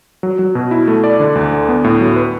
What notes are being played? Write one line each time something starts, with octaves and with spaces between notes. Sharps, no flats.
F#3
F#3
B2
E4
A3
D5
D3
D2
D3
B3
A2
F#3
B4